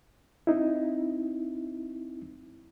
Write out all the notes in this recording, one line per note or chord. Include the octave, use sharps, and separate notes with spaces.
C4 D#4 E4